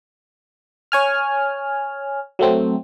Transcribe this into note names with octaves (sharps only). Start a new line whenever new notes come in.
C#5 G#5 F6
F#3 A3 C4